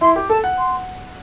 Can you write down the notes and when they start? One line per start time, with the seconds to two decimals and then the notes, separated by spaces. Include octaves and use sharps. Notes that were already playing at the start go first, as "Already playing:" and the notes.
0.01 E4 C6
0.16 G4
0.29 A4 A5
0.44 F#5
0.58 C6